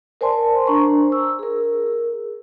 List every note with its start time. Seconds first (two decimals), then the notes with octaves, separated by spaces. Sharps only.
0.21 A#4 C5 D5 G#5 A5 C6
0.67 D4 A#4 C5 A#5 C#6
1.12 E6
1.39 G#4 A#4